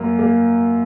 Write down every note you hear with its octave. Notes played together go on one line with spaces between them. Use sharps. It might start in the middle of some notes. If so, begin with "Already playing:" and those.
Already playing: F#2 A#3 A#5
A#3